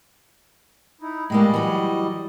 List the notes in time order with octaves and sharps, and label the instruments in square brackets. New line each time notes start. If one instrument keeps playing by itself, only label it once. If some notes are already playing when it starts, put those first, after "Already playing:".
[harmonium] D#4 E4
[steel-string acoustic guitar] A2 G#3 A#3 [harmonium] G3 D#5
[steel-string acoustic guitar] E3 F#3